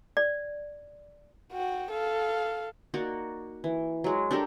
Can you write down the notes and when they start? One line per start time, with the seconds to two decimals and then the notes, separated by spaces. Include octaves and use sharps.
0.17 D5
1.52 F#4 G5
1.91 A4 F5
2.94 A#3 D#4 F#4 D5
3.64 E3
4.04 F#3 G#3
4.31 D4 G4 A4 A#4